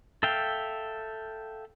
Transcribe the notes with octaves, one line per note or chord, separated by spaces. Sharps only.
A4 E5 F5 G5